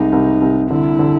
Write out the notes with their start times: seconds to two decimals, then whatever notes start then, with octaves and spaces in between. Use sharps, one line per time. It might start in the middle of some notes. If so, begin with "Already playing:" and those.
Already playing: C2 G#3 D#4
0.12 C2
0.41 C2
0.70 D3 E4
0.99 D3